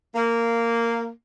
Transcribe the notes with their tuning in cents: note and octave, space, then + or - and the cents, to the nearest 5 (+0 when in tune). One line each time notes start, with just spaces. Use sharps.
A#3 -10